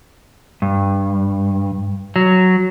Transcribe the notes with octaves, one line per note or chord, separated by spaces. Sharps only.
G2
F#3